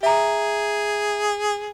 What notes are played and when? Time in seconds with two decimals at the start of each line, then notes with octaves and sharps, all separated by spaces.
0.03 G#4 E5 A#5